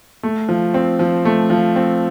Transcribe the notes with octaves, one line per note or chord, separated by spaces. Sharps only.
A3
F3
C4
F3
A3
F3
C4